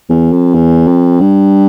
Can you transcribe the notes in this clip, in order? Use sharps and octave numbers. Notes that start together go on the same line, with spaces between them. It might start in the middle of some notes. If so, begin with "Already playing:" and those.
E2
F2
E2
F2
G2